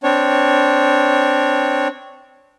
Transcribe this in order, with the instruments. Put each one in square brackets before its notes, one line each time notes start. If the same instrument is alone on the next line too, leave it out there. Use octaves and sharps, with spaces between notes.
[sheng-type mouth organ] C4 D4 C#5